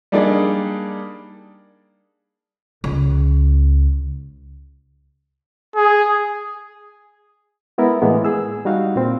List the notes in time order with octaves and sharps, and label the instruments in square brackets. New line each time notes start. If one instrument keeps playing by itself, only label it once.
[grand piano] G3 A#3 D4 D#4 G#4 D5
[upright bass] C#2
[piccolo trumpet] G#4
[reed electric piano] G#3 B3 E4 A#4
A2 E3 G#3 A#3 B3
G#4 E6
G3 D#4 F#4 F5
A#2 C4